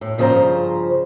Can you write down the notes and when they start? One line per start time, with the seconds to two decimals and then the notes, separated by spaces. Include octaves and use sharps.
0.01 A2
0.18 G2 C#3 F3 G#4 C5 A#5